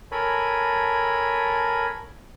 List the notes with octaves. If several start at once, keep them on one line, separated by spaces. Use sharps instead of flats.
A4 A#4 C#5 G#5 B5